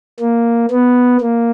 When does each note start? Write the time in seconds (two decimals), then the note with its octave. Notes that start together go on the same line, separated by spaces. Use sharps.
0.20 A#3
0.71 B3
1.21 A#3